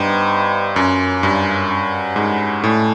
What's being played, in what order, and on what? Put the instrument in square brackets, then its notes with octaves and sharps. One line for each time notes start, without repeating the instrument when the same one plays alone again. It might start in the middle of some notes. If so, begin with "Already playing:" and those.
Already playing: [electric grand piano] G2 [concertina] B3 D#4 G4 C5
[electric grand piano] F#2 [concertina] A#3 C#4 F4
[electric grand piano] G2
[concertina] C#4 F#4 A#4 C#5 F#5
[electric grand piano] G#2
[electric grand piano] A2 [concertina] A3 C#4 E4 A4 D5